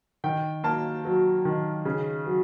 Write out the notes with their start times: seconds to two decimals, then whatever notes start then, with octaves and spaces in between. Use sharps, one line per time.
0.24 D#3 G5
0.64 A#3 A5
1.05 F#3
1.45 D#3
1.85 C#3
2.26 F#3